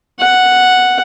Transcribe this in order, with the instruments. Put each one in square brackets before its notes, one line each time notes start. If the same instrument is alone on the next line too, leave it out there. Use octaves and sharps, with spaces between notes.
[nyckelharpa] F#5